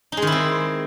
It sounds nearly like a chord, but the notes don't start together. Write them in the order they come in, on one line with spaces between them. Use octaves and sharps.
D#4 G#3 D#3 E4 C4